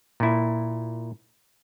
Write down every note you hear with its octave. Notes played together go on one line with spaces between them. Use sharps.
A#2 E4